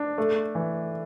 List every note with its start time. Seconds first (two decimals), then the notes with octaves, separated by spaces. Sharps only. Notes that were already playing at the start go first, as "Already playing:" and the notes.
Already playing: D4
0.18 A3
0.55 E3